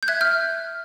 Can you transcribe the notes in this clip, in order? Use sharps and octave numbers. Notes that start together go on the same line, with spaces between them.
G6
E5 F#6 G#6
F6 G6
E5